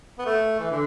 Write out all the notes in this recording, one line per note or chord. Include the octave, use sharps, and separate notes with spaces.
B3
A3
E3
D3